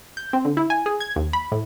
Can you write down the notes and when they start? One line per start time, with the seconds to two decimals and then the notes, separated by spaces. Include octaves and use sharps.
0.17 G6
0.33 C4
0.45 D3
0.57 E4
0.70 G#5
0.86 G#4
1.00 G#6
1.16 D#2
1.33 B5
1.52 A2